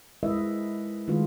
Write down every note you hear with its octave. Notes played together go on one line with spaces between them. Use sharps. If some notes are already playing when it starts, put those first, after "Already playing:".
G#3 E4 A#4 B4 D#5 E5
D#3 G#3 A3 D#4 F4 B4